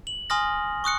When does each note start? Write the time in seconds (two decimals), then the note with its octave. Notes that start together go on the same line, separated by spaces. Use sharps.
0.07 F#7
0.30 G#5 C6 D#6 F6 A#6
0.84 C#6 D#6 F#6 C#7